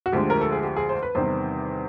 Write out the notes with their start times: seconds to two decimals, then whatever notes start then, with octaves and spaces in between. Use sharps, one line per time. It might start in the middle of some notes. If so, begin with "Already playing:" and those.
0.06 F#4
0.12 D2 D3 F3 G#3 G4
0.30 A#4
0.41 A4
0.52 G#4
0.63 G4
0.77 G#4
0.89 C5
1.03 B4
1.15 E2 C3 D#3 G3 C5